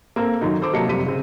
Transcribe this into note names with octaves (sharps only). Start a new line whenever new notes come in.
A#3 C4 A4 A#4
F#2 D#3 F#3 D#4
A4 C5 C6 D6
C3 F#3 A#3 D#5 A5 C#7
F1 F#2 C3 G3 B6 D#7
C#3 C4